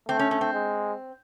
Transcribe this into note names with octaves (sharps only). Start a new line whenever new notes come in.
A3 C4
C#4
C#4
C4
G#3